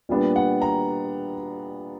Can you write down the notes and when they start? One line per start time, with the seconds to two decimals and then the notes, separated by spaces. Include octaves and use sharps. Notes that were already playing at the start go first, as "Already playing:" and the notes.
0.09 A#2 G3 B3 D4
0.36 F#5
0.62 A#5